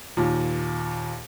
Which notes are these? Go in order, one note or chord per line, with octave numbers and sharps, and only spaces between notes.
D#2 A#2